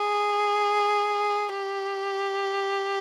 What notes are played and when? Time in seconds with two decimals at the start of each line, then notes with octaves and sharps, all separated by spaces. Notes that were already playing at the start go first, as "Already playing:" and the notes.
Already playing: G#4
1.49 G4